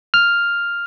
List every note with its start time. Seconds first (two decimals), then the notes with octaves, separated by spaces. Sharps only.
0.14 F6